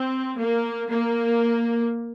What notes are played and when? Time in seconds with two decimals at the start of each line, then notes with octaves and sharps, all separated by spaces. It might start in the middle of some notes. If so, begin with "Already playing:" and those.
Already playing: C4
0.37 A#3
0.89 A#3